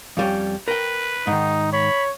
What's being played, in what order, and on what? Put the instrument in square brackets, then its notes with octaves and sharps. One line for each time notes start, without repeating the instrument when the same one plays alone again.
[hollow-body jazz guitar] F2 G3 C#4
[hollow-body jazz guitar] A#4 G5 [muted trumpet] B4
[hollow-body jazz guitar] G#2 D#3 [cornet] D#4
[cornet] C#5 [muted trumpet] B5